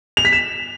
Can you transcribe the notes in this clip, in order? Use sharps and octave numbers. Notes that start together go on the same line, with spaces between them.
F7
B6
E7